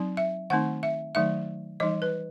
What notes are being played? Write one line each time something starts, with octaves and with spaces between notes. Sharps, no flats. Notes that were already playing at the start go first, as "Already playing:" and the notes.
Already playing: F#3 C4 D#4
E5
D#3 A3 C4 D#4 F#5
E5
D#3 F#3 A3 D#4 E5
E3 G3 D#4 D#5
B4